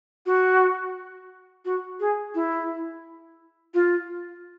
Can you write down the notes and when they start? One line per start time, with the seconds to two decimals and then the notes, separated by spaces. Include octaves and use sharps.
0.26 F#4
1.65 F#4
2.00 G#4
2.35 E4
3.74 F4